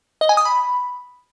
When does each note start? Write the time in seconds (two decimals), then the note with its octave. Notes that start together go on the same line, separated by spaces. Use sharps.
0.21 D#5
0.29 G#5
0.37 D#6
0.45 B5